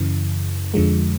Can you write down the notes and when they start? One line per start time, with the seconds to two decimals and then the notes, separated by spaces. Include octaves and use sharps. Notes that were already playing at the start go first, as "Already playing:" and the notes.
Already playing: F#2 C#3 E3
0.74 F2 D3 F3 G#3